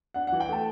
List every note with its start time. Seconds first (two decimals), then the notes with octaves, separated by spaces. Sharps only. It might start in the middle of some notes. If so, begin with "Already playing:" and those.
0.14 D4 F#5
0.27 E3 F#5
0.40 G5
0.49 A3 A5